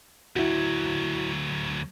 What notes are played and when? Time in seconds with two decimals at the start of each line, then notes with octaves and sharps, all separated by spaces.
0.36 D2 F#3 E4 F#4